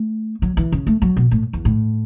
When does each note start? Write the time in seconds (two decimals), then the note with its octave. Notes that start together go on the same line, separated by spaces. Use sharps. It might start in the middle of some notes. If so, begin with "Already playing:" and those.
Already playing: A3
0.42 F#3
0.57 E3
0.72 C#3
0.87 A3
1.02 F#3
1.17 B2
1.31 A2
1.53 E2
1.65 A2